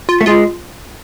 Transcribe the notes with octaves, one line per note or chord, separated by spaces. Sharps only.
F4
A3
G#3 F4